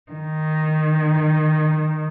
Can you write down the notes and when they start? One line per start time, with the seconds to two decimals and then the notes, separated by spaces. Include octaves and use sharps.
0.12 D#3